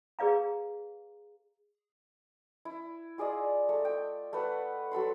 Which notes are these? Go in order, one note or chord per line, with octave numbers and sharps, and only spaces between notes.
G#4 B4 D5 F5 A#5
E4
F4 G#4 D5 D#5
A3
G5
A3 B4 F#5
F#3 A4 B5 C6